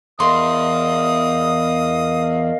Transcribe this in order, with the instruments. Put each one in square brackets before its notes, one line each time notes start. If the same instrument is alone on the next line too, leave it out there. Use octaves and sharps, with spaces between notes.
[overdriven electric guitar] E2 [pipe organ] A#4 D#5 F5 [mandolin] C6 [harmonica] D#6